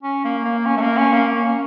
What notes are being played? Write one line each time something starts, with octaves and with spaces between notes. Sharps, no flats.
C#4
A#3
A#3
C#4
A3
A#3
C#4
A#3
A#3
C#4